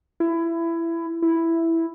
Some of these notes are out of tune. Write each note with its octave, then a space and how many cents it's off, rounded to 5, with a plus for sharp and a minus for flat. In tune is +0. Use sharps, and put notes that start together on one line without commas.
E4 +20
E4 +0